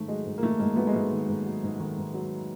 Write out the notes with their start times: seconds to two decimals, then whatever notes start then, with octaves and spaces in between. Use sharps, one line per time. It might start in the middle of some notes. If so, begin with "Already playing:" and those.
Already playing: G#2 D#3 A3
0.08 F#3 G#3
0.25 G#2
0.38 A#3
0.43 D#3 A3
0.59 G#2 G#3 A#3
0.76 F#3 A3 B3
0.87 G#3
0.93 G#2 A3
1.12 D#3
1.28 G#2
1.45 F#3
1.63 G#2
1.80 D#3
1.97 G#2
2.14 F#3